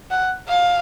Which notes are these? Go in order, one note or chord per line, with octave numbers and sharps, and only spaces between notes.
F#5
F5